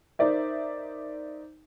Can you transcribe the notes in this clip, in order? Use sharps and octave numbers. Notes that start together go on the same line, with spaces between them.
D#4 A#4 C5 D5 E5